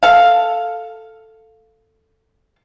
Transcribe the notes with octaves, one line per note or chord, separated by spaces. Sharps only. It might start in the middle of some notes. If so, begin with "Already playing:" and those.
A4 F5